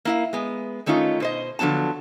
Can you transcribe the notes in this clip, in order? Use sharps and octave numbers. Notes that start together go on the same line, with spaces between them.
A#3 E4 F5
G#3 B3
D#3 A3 C#4 D#4 F4
B2 C5 D#5
D3 F3 F#3 B3 A5